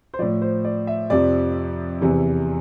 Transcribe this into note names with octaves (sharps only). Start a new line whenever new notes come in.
C5
A2 F3 D5
C5
D5
E5
F2 C3 F3 D5
E2 C3 E3